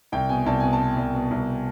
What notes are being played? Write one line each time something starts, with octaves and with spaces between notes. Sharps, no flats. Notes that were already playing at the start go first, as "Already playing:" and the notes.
C2 G5
B2 G#5
C2 A5
B2 G#5
A5
B2
C2
B2
C2